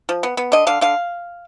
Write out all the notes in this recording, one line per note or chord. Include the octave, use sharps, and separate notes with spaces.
F3
B3
B3
D3 D#5
D3 F5
D3 F5